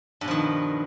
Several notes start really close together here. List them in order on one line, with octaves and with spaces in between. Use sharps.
G2 B2 F3 D#3